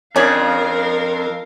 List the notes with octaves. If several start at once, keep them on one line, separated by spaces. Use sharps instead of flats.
F2 C#4 D4 G#4 A#4 F5